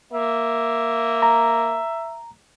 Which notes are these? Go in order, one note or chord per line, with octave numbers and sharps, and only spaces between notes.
A#3 E5
A#5